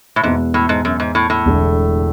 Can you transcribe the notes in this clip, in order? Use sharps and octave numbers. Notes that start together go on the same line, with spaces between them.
A2
E2 G#2 B2 G#3 B3
A2
G#2
F#2
G#2
A2
A2
E1 E2 D3 G#3